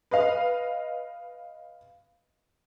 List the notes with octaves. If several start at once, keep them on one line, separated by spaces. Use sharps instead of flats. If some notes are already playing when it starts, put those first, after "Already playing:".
B4 D#5 F5